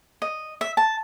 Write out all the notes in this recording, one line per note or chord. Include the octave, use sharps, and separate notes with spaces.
D#5
E5
A5